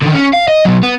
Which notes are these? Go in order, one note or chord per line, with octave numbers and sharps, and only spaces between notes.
D3 D#3
C#4
F5
D#5
B2 F#3
B3